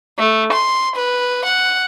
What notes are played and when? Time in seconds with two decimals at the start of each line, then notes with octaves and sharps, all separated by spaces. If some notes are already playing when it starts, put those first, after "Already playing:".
0.19 A3
0.52 C6
0.96 B4
1.45 F#5